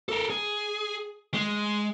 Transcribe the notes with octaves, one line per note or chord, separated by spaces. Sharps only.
A4 A#4
G#4
G#3